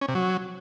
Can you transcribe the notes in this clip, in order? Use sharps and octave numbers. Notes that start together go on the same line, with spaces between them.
C#4
C3
F#3